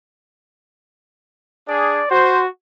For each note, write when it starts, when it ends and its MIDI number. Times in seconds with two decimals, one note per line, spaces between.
1.68 2.03 62
1.68 2.03 68
1.68 2.11 74
2.11 2.47 66
2.11 2.41 72